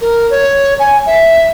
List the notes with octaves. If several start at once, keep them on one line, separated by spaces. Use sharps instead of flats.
A#4
C#5
G#5
E5